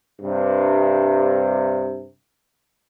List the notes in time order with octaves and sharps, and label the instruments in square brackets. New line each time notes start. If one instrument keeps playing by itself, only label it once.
[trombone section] G2 C3